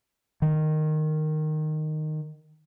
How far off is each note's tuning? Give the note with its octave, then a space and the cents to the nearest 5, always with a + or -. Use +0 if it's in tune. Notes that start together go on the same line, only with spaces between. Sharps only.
D#3 -10